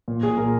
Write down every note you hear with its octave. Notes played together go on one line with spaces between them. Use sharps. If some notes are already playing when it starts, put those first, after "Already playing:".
A#2
A#2 G#4
A#2 A#4